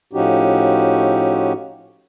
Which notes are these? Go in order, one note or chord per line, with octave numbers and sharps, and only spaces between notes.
A2 F3 C#4 D#4 F#4 G4